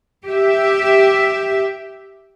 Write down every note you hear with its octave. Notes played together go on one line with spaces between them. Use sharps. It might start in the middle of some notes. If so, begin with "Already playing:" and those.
G4 E5